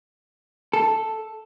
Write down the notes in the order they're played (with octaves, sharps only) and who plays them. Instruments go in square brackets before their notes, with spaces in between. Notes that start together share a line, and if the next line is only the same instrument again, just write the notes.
[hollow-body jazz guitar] A4